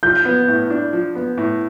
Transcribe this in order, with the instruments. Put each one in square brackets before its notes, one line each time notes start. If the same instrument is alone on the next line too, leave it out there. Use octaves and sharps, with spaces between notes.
[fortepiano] F3 [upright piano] G6
[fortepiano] B3
A2
D4
F3
B3
A2